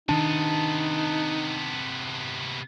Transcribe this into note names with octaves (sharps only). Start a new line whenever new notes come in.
C3 D#3 B3 D4 D#4 A5